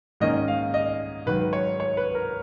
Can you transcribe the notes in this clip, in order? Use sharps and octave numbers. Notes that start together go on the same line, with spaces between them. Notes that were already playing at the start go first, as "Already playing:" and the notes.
G#2 D#3 A#3 C#4 D#5
F5
D#5
G#2 D#3 F#3 B4
C#5
C#5
B4
A#4